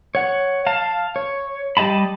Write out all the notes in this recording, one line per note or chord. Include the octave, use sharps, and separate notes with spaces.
C#5 F#5
F5 A5
C#5
G3 G4 D#5 A5 B5